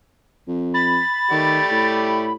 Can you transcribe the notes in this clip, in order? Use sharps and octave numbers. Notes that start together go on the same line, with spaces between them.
F2
B5 A6
D#3 A3 G4 D5
A2